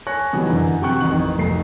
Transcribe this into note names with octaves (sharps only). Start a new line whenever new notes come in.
C#5 G#5 A5 C#6 F#6 A#6
B2 D#3 E3 F#3 G3
F#2 D3 E3
C3 F#3 F#4 G5 C#6 F#6
A1 F2 D#3 F#7
F1 B1 A3 C7